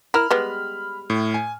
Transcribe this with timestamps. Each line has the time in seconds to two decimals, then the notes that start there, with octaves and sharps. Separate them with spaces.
0.14 E4 A#4 B5 F6
0.30 G3 G#3 B3
1.10 A2
1.34 G#5